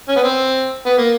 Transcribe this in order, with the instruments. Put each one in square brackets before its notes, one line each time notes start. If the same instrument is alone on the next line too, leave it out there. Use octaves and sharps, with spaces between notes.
[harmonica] C#4
B3
C4
B3
A#3